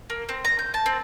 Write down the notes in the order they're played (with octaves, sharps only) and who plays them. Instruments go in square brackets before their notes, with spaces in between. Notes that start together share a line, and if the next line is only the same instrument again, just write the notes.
[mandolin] A#3
C4
A#5
G6
A5
C4